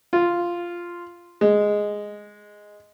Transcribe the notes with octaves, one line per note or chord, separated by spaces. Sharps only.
F4
G#3